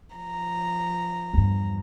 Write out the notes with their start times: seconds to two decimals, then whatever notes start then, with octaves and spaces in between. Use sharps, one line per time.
0.15 F3 A#5
1.33 E2 G2